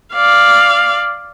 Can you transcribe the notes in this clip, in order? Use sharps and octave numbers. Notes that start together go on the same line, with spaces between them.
D5 F5